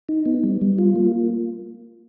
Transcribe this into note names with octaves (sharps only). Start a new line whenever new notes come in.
D#4
B3
G3
G3
F4
A#3